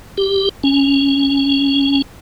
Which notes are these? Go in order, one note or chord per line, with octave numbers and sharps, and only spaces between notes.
G4
C#4